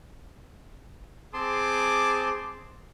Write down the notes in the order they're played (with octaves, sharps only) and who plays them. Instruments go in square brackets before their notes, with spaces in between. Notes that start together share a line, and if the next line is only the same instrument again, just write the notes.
[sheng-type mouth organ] C4 A5 C6 [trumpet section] G#4 D6